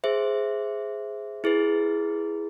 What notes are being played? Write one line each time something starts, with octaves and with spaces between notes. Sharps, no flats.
G#4 C5 E5
E4 G#4 B4